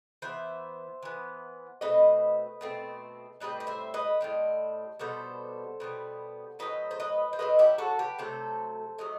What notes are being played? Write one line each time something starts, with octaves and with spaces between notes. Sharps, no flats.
E3 B3 C5 E5
E3 B3
B2 A3 C4 B4 D#5
B2 A3 C4
A2 G3 C4 B4 D#5
D#5
C5 E5
B4 D#5
A2 G3 C4
B2 G3 B3 A4 C5
B2 G3 B3
A2 F#3 C4 B4 D#5
C5
B4 D#5
C5
A2 F#3 C4 B4 D#5
E4 G4
F#4 A4
G4 B4
C3 F#3 A3 A4 C5
C3 F#3 A3 D#5